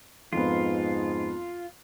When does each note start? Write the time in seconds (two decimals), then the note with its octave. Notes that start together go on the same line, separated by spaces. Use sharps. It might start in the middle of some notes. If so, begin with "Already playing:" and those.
0.33 F2 G#2 B3 F4